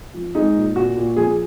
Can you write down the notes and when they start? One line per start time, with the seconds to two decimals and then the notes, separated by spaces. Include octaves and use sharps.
0.14 F3
0.35 G#3 D#4
0.55 A#2
0.76 A#2 F#4
0.97 A#2
1.16 F3 G#4